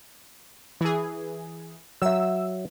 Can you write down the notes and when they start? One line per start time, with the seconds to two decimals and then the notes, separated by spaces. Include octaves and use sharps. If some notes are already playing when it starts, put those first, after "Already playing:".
0.81 E3 G#4
2.02 F#3 E5 E6